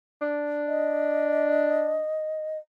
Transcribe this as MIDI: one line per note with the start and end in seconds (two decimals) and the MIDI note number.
0.21 2.00 62
0.67 2.58 75